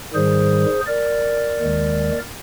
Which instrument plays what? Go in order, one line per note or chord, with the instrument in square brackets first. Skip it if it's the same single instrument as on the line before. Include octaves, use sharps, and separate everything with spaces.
[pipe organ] G#2 D#3 G3 G#4 C5
A#4 D5
D#2 D#3 G#3